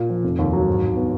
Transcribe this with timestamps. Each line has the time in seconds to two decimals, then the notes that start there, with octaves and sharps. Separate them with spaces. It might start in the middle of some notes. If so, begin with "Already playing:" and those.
Already playing: A#2
0.10 F3
0.23 F1
0.39 D#2
0.53 F#3
0.68 G#2
0.82 G#2
0.96 B3